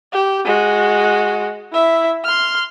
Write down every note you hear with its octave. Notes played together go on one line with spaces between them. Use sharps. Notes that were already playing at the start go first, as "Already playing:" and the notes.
G4
G#3 F#4
E4 E5
C6 F6